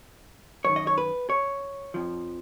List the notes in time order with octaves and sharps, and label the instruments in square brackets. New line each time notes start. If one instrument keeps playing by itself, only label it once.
[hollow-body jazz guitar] F#2 D#3 C#5
D#5
C#5
B4
C#5
F2 F3